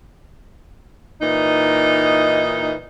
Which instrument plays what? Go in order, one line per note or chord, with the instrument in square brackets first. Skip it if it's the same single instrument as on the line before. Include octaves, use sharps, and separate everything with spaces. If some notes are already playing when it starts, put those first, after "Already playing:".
[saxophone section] A#2 E3 D#4